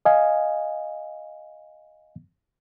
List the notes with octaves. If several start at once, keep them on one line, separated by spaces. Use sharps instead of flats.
D#5 F5 G#5